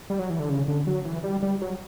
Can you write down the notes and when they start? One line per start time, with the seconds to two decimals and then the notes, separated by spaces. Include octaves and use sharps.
0.10 G3
0.19 F#3
0.30 E3
0.39 D3
0.50 C#3
0.68 D3
0.87 F#3
1.05 E3
1.24 G3
1.43 G3
1.62 F#3